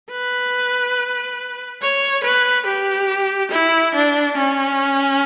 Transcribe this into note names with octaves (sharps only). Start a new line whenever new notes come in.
B4
C#5
B4
G4
E4
D4
C#4